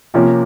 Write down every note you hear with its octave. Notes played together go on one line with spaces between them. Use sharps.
C3 F3 A#3 C#4